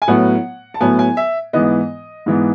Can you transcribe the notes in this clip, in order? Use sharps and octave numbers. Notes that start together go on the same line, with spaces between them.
G#5
A2 F#3 B3 F#5
A5
A2 F#3 B3 G#5
G#5
E5
G#2 E3 B3 D#5
G#2 E3 B3